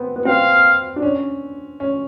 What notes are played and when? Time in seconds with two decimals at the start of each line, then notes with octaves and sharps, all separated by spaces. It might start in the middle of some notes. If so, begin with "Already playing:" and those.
Already playing: B3 C4
0.16 B3
0.25 C4 F5
0.96 D4
1.02 C#4
1.80 C#4